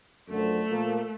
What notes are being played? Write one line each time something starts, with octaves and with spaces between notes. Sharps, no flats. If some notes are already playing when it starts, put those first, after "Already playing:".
F#2 D3 F3 A3
A#2 F3 A#3